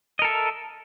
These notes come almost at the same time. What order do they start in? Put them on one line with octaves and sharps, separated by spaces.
D#5 A#4 A4 E5